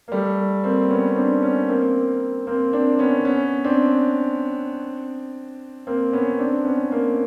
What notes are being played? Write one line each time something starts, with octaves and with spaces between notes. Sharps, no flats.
A#3
G3 A3
A#3 C4
B3 C#4
C4 D4
B3 C#4
A#3 C4
A#3 C4
C4 D4
B3 C#4
B3 C#4
C4 D4
A#3 C4
B3 C#4
C4 D4
B3 C#4
A#3 C4